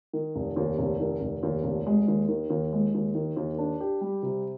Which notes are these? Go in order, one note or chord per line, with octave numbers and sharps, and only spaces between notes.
D#3
F1
D#2
F1
D#3
F1
D#2
F1
G#3
D#2
D#3
D#2
G#3
D#2
D#3
D#2
D4
G4
G3
C3